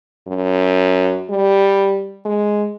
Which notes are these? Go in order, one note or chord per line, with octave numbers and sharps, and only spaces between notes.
F#2
G3
G#3